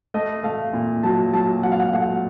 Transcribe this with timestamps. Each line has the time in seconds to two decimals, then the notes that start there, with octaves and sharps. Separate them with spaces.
0.14 A3 D#5
0.43 A3 F5
0.73 A#2
1.03 F#3 A5
1.33 F#3 A5
1.63 F#3 F#5
1.72 F5
1.80 F#5
1.93 A3 F#5